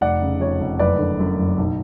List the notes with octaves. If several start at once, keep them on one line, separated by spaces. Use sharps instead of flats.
F1 D5 F#5
C#3
F2 C#5
F1
F#1 B4 D5
D3
F#2
F#1
B1